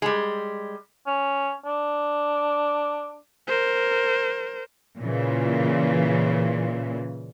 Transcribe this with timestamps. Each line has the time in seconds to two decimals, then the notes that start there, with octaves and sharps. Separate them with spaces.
0.02 G3 G#3
1.07 C#4
1.65 D4
3.48 A#4 C5
4.98 A#2 C#3 E3